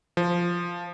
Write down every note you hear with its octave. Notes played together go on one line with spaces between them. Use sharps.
F3